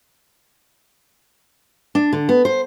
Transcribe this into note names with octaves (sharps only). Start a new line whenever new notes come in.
D4
D3
B3
C5